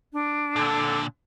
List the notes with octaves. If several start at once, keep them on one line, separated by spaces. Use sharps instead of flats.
D4
A#2 D3 A4